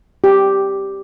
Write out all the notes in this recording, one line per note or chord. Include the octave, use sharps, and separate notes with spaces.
G4